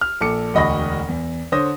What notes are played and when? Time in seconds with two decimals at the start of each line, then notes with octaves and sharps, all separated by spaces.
0.01 F6
0.21 A#1 A4 D6 C#7
0.54 E1 D2 D#5 B5 C#6 A#6
1.08 E2
1.52 D3 C5 C#5 D#6 A#6